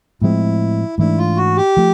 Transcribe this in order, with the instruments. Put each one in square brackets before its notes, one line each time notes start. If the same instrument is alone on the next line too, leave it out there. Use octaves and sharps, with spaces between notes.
[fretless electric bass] A2 F3 G#3 C4 [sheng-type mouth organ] E4
[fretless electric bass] G#2 E3 A3 D4 [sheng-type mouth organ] E4
[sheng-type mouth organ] F4
F#4
G4
[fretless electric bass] F3 A3